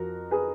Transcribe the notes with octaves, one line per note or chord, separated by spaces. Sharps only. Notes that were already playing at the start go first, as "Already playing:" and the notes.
Already playing: F2 F3 F#4 A#4
G#4 B4